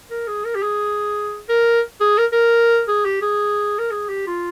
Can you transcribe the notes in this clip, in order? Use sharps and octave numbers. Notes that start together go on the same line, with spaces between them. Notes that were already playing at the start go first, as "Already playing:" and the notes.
A#4
G#4
A#4
G4
G#4
A#4
G#4
A#4
A#4
G#4
G4
G#4
A#4
G#4
G4
F4